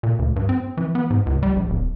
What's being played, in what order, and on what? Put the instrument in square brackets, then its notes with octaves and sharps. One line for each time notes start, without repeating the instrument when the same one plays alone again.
[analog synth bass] A#2
D2
G2
C4
E3
B3
G#2
C#2
G3
A#1
D1